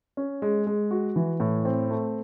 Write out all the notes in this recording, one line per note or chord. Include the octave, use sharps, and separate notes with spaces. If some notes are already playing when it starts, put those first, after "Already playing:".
C#4
G#3
G#3
F#4
E3
A2
C4
A3